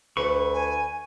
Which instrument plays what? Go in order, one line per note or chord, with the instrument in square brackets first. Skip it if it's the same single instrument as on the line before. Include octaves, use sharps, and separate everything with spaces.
[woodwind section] D2 [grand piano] B4 [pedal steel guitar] C#6
[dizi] G#5